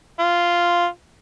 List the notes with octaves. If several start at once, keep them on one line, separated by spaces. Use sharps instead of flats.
F4